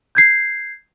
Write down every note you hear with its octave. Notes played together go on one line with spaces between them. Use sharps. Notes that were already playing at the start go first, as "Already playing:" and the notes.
G6 G#6 C7